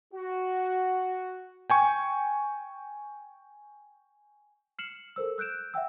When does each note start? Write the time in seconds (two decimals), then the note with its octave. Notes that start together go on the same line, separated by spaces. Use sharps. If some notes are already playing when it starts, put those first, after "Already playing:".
0.13 F#4
1.70 G5 G#5 C#6
4.79 F6 C7 C#7 E7 F#7
5.16 A4 A#4 C5 E6
5.38 E6 F#6 G6 D7 E7
5.74 E5 F#5 G5 E6